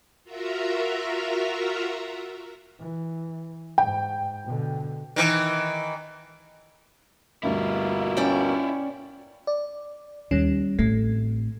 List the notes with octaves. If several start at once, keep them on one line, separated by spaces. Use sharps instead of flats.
F4 F#4 A#4 E5 A#5
E3
G#2 G5
B2 D3
D#3 E3
D2 G2 B2 A#3 E4 F4
C#4 D5 G5
D5
D#2 G3 C#4
A1 A3 C4